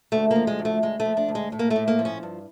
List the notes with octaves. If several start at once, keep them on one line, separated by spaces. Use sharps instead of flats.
D2 A3
F3 A#3
G#3
D2
A3
D2 G#3
A3
F3
D4
D2
G#3
A2
A#3
A3
A2
A#3
F3
C#4
G2